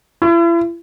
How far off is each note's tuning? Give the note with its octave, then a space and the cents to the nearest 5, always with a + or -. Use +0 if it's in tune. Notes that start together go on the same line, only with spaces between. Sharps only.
E4 +40